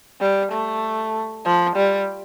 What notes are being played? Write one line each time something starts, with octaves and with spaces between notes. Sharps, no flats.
G3
A3
F3
G3